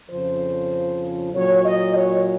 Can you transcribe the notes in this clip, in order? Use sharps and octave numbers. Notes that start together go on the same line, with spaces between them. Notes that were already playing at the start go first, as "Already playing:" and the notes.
F2 C#3 F3 C5
A#2 F#3 C#5
D#5
C#5